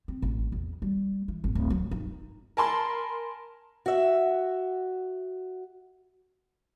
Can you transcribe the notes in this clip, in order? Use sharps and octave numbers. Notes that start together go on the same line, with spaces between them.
C4
A1
E2
G3
E3
G#1
D1
F#3
D#4
A#4 G#5 A5 B5 C6
F#4 E5